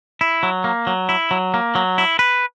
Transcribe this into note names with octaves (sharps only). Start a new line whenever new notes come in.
E4
F#3
A#3
F#3
E4
F#3
A#3
F#3
E4
B4